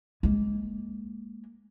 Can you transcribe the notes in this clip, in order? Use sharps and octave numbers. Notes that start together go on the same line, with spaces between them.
G#3 A#3